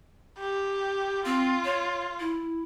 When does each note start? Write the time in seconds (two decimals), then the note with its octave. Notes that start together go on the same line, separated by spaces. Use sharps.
0.38 G4
1.25 C4 F4
1.65 C#5
2.20 E4